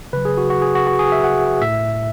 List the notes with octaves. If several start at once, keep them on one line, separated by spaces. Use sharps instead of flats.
C#3 F#3 B4
G#4
F#4
F#4
G#4
F#4
F#4
G#4
E5
F#5
A2 E5